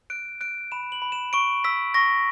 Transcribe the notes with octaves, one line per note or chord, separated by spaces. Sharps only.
F#6 D7
F#6 D7
B5 E7
F#7
B5
E7
C#6 D7
E6 B6
C#6 A#6